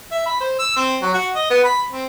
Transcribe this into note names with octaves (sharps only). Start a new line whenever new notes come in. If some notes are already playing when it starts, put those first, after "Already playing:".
E5
B5
C5
E6
C4
F#3
F#4
D#5
B3
B5
C4